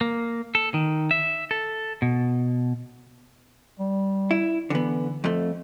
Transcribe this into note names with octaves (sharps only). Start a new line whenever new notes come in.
A#3
A4
D#3
E5
A4
B2
G3
E4
D3 E3 B3
F2 A3